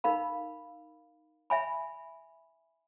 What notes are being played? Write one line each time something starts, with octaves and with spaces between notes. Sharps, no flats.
D#4 A#4 F5 B5
E5 G#5 B5